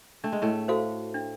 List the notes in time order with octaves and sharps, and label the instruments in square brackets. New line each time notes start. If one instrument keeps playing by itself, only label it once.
[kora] A3 [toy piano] D4
[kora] G#3
A2 A3
[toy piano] F#4 A4 C5 F5
D4